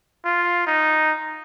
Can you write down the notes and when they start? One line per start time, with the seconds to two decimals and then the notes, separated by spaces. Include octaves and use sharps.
0.25 F4
0.67 D#4